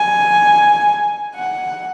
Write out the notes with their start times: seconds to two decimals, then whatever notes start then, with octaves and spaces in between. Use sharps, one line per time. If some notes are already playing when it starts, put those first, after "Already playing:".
Already playing: G#5
1.36 F#5